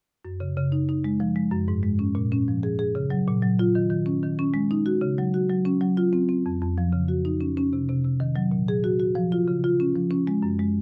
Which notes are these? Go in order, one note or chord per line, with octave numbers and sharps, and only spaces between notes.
F#2
C#3
C#3
D#4
D#4
G#3
F3
G#3
F#2
G#2
G#3
C#4
A#2
C#4
F3
G#4
G#4
C#3
F#3
A#2
F#3
F4
D#3
D#3
C#4
D#3
C#4
G#3
D#4
F#4
C#3
F#3
F#4
F#3
C#4
F#3
F4
C4
C4
F2
F2
F3
C#3
F#4
D#4
C#4
C#4
C3
C3
C3
D#3
F#3
A#2
G#4
F#4
F#4
F3
F4
C#3
F4
C#4
F3
C#4
G#3
F#2
G#3